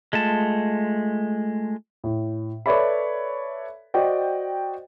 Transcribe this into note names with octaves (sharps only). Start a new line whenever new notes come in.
G#3 A3 F4 A5
A2
A4 B4 C#5 D5 E5 B5
F#4 C5 D5 D#5 G5